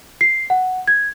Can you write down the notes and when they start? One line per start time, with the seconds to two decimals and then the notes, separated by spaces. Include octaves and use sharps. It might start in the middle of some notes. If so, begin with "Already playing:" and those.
0.21 C7
0.50 F#5
0.88 G#6